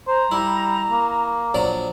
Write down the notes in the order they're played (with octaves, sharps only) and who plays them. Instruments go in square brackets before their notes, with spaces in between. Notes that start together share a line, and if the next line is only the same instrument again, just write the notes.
[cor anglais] C5 [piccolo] A#5
[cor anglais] G3 [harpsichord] E4
[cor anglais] A#3
[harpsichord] A#1 F#3 D5